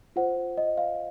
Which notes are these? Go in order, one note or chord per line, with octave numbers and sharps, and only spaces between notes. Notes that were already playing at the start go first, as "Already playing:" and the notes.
F4 C5 F#5
D#5
F5